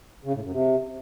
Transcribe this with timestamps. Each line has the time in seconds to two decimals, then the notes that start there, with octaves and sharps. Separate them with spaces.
0.24 C#3
0.33 A2
0.42 F#2
0.51 C3